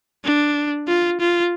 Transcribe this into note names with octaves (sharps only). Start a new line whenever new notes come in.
D4
F4
F4